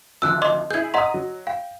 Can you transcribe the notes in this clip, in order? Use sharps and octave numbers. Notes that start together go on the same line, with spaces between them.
G#1 D2 F3 E6 F#6
D#5 C6 D6
E4 G#4 G6 G#6
D#5 F#5 A#5 C6 D#6
F#3
F5 G5